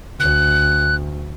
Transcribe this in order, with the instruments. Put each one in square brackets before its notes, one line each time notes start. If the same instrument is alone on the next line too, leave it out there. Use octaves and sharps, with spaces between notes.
[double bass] D2 [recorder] F#6